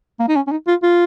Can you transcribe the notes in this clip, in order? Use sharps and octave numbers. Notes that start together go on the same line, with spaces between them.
A#3
D#4
C#4
C#4
D#4
F4
F4